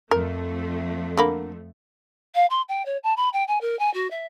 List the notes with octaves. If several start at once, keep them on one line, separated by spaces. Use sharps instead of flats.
F2 A3 A#4
D3 A#3 B5
F5
C6
G5
C#5
A5
B5
G5
G#5
A#4
G#5
F#4
E5